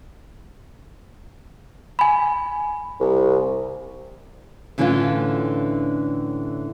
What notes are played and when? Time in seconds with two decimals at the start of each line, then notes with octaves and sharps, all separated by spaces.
1.99 G#5 B5
3.00 C2
4.78 A2 D3 E3 C#4 D4 F4